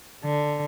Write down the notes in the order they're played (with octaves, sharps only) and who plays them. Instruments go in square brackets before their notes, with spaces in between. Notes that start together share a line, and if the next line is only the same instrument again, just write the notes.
[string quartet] D3